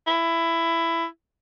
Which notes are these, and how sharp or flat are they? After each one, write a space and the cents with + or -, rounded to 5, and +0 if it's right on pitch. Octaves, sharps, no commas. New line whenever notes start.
E4 +15